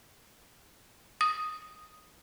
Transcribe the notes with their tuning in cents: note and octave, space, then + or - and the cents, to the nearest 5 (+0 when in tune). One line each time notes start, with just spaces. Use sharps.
D#6 +5